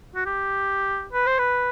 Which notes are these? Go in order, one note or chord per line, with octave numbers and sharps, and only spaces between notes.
F#4
G4
B4
C5
B4